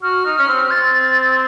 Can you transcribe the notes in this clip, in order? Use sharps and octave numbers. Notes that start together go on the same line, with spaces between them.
F#4 F6
D#4
C#4
C4
C4 A6